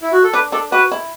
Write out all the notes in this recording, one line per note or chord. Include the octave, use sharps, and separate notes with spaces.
E4
F#4
A4
D4 B4
D4 A4
F#4 B4
E4